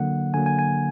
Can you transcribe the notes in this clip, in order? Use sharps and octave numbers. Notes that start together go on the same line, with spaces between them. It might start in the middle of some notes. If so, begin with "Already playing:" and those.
Already playing: D3 F#3 A#3 F#5
D3 F#3 A#3 G#5
G#5
G#5